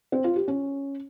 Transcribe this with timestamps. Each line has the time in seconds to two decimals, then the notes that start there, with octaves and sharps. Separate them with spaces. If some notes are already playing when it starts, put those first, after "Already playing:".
0.12 C4
0.24 F4
0.36 G4
0.48 C#4